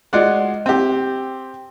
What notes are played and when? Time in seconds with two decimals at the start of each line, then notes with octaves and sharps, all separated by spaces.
0.13 G#3 F4 F#4 D5 F#5
0.66 C4 G4